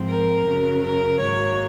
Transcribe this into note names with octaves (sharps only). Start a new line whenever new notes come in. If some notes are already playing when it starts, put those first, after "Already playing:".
Already playing: G#2 F3 C4
A#4
F#2 C#3 F#3
A#4
G#2 D#3 F#3 A#3 C#5